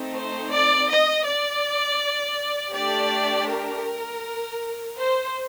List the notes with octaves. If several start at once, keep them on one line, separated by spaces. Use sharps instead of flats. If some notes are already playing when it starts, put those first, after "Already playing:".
Already playing: A3 C4 D#4
C5
D5
D#5
D5
A3 D4 G4 D5
A#4
C5